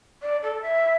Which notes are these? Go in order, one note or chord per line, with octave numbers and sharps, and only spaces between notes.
D5
A4
E5